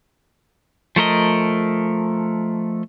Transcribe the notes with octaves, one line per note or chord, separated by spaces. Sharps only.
F3 A3 A#4 D#5